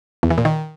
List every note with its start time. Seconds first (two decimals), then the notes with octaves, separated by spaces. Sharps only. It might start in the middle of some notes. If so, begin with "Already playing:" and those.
0.23 E2
0.30 E3
0.38 A#2
0.45 D#3